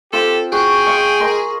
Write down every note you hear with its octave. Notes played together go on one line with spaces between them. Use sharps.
C4 F4 G4 A4
F#4 G#4 G5
G#3 F5 C#6
A#4 D#5 C6